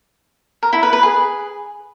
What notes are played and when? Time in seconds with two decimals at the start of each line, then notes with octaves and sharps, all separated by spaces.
0.63 A#4
0.73 E4
0.83 B4
0.93 B4
1.03 G#4